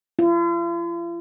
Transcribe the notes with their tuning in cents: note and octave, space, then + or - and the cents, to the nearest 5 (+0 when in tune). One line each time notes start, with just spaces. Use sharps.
F4 -45